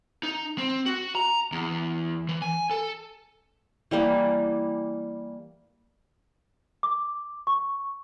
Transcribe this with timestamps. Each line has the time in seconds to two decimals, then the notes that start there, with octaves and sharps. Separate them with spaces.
0.23 D#4
0.58 C4
0.86 F#4
1.15 A#5
1.52 E2
2.29 E3
2.42 G#5
2.71 A4
3.91 E3 G3 A#3 D5
6.83 D6
7.47 C#6